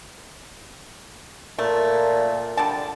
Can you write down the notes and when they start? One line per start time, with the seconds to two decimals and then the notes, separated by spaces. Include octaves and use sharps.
1.59 A#2 A3
2.57 D3 G3 A5